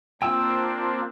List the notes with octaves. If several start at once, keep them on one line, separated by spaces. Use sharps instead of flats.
A#3 C4 D4 F4 G5 E6